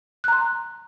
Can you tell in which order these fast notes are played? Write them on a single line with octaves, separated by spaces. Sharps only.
F#6 A#5 C6